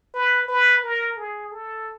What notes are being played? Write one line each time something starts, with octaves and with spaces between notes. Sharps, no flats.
B4
B4
A#4
G#4
A4